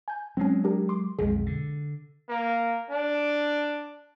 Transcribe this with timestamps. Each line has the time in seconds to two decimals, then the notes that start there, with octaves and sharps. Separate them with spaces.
0.08 G#5 G6
0.37 F#3 G#3 C4 C#4
0.64 D4 G4 A#4
0.89 C6 D6
1.19 B1 F2 G#3 G#4
1.46 D3
2.29 A#3
2.91 D4